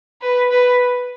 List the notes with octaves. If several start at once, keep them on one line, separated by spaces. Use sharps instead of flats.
B4
B4